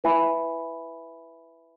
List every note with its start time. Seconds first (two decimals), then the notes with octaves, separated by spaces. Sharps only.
0.04 E4 B4 E5 G#5 B5